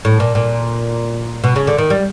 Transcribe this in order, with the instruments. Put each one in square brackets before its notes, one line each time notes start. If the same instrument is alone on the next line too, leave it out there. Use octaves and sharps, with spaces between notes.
[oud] A2
A#2
A#2
B2
C#3
D3
D#3
G3